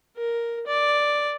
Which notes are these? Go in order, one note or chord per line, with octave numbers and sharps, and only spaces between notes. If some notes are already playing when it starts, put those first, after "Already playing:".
A#4
D5